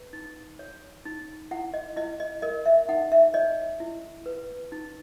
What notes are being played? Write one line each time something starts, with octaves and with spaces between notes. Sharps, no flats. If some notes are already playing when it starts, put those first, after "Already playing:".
Already playing: B4
D#4
C#5
D#4
E4 F#5
D#5
E4 D#5
D#5
A#4 D#5
E5
D#4 F#5
E5
C#5 D#5
E4
B4
D#4